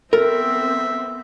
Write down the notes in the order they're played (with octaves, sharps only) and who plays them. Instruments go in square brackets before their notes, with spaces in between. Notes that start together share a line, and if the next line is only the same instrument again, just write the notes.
[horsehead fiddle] B3 C4 [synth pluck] A4 [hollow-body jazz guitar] A#4 [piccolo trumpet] E5